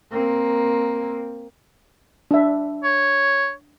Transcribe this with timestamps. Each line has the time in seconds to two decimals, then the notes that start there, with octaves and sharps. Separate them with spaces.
0.12 A#3 C4
2.31 D4 E5
2.84 C#5